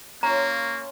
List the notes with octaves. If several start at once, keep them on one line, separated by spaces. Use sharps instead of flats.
A#3 C#4 F4 A#5